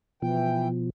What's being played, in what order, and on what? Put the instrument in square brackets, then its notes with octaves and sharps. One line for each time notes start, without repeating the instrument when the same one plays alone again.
[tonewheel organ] B2 F3 [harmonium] E3 G5